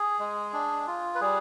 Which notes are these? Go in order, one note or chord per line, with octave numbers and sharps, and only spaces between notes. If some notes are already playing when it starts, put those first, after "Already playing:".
Already playing: G#4
G#3
D4
F4
B4
G3 G#4